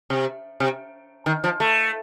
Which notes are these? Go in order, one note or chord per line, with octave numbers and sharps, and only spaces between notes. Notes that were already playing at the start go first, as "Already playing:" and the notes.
C3
C3
D#3
F3
A3